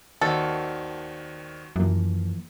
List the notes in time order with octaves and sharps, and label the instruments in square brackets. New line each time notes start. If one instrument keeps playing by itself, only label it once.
[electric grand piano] D#2 D#3 F#4 [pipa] A4 [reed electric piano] C5 D5 D#5
[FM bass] F#2 [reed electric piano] E3 F3 A#3